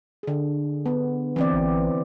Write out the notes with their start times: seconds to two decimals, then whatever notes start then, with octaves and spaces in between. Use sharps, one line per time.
0.23 D3 G#4
0.86 B3
1.36 E3 C4 D5
1.53 A1